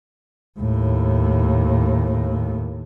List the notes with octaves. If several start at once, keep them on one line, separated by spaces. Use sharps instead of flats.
D#2 A2